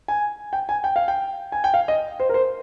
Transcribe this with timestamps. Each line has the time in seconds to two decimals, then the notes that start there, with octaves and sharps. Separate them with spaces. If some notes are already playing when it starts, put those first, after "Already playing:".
0.08 G#5
0.53 G5
0.69 G#5
0.84 G5
0.96 F5
1.08 G5
1.52 G#5
1.64 G5
1.74 F5
1.88 D#5
2.20 C5
2.29 A#4
2.34 C5